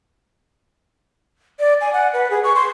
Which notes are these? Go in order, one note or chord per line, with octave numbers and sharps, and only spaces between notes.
D5
G#5
F#5
B4
G#4
C#6
C6